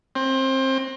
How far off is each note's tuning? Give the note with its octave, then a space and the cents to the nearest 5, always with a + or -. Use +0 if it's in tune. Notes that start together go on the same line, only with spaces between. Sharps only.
C4 +25